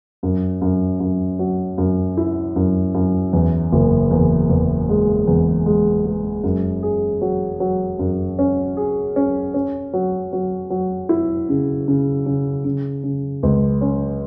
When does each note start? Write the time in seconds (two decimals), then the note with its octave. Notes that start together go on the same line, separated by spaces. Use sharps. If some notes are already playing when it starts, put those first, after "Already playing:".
0.23 F#2
0.61 F#2
1.00 F#2
1.39 F#3
1.78 F#2
2.17 E4
2.56 F#2
2.94 F#2
3.33 E2
3.73 F#1
4.11 E2
4.50 E2
4.89 G#3
5.28 E2
5.66 G#3
6.06 G#3
6.43 F#2
6.83 G#4
7.22 F#3
7.60 F#3
7.99 F#2
8.39 C#4
8.77 G#4
9.16 C#4
9.54 C#4
9.94 F#3
10.33 F#3
10.70 F#3
11.09 E4
11.49 C#3
11.88 C#3
12.26 C#3
12.64 C#3
13.03 C#3
13.43 C#2
13.81 C#4